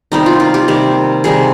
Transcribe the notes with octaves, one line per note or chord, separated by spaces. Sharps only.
C3 D#3 G3 A#3 D#4
F4
F4
G4
C3 D#3 G3 A#3
C3 D#3 G3 A#3 G#4